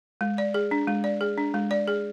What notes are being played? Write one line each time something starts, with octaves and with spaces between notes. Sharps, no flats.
G#3
D5
G#4
D4
G#3
D5
G#4
D4
G#3
D5
G#4